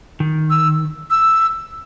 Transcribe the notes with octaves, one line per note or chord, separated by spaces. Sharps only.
D#3
E6
E6